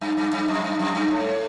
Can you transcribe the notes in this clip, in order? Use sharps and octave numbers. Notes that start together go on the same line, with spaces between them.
G2
G2
G2
F#2
G2
F#2
G2
A2